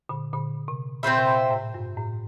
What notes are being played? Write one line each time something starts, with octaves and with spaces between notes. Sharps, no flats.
A#2 D3
A#2 D3
C3
A#2 C4 F4 C5 E5
C3
A#2
A2
G2
A2